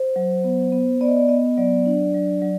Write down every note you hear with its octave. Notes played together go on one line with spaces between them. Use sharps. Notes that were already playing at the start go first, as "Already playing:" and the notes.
Already playing: C5
F#3
B3
B3
B3 D5
D#5
D5
B3 D#5
F#3 D5
D4
F#3
F#3